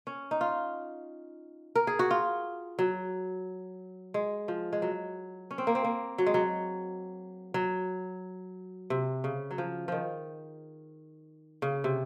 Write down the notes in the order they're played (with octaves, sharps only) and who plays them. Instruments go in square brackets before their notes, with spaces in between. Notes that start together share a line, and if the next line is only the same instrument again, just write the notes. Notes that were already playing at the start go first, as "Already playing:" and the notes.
[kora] C#4
D#4
F4
A#4
G#4
F#4
F4
F#3
G#3
F3
G#3
F#3
C#4
C4
A#3
C4
A#3
F#3
G#3
F#3
F#3
C3
C#3
F#3
F3
D#3 F3
C#3
C3